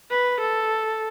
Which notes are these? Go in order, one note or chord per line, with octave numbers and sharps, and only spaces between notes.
B4
A4